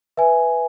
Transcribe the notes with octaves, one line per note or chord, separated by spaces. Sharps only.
B4 E5 G#5